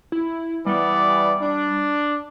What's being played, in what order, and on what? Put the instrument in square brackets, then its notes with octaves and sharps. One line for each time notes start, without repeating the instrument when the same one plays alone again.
[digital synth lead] E4
[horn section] E3 B3 D5 [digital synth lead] G3
[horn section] D4